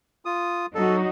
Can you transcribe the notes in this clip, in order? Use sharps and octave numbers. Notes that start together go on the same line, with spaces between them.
F4 D#6
F#3 D#4 F#4 A4